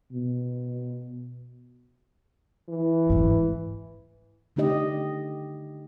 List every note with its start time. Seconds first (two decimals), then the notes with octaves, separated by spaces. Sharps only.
0.12 B2
2.69 E3
3.10 D2 G#2
4.56 D3 A3 D#4 G4 D#5